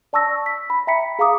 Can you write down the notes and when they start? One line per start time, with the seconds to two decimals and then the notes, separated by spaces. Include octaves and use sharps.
0.13 D5 A5 C#6 E6 A#6
0.46 B6
0.70 B5
0.87 E5 G5 A#5 B5 B6 C#7
1.19 G#4 F5 A#5 D6 D#6